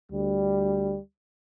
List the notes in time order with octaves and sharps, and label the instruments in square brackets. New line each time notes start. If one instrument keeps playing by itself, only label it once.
[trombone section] D2 G3